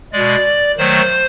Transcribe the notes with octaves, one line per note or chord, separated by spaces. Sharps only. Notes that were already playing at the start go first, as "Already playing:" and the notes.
B2 G#3 D5
D#3 F#3 A3 C5